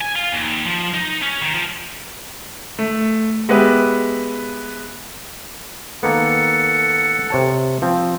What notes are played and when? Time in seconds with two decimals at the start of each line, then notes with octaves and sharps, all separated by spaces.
0.01 G#5
0.16 F4
0.32 D#2
0.65 F3
0.93 D#4
1.22 C#4
1.41 D#3
1.54 F3
2.79 A3
3.49 G#3 B3 G4 B4 E5
6.03 D#3 A#3 B3 A4 F#5
7.30 C3 C#5 A5
7.82 F3 C4